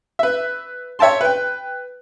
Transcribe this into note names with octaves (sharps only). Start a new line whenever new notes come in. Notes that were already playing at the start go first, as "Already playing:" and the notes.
B4 E5
C#5 E5 G5 A5 C6
B4 G5